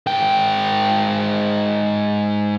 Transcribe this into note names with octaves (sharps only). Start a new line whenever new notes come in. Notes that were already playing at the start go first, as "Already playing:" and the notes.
G#2 G5